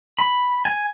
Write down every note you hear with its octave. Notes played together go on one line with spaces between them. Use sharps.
B5
G#5